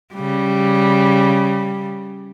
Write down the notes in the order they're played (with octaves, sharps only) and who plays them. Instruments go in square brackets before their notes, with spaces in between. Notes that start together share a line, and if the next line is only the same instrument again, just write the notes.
[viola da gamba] C#3 G3